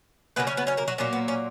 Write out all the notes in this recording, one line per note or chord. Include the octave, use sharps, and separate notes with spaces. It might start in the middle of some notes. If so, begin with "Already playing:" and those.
C#3 F#3 A#3 B3 B4
C#4 C#5
B3 B4
C#4 C#5
A#3 A#4
F#3 F#4
A#2 F#3 A#3 C#4
B3
C#4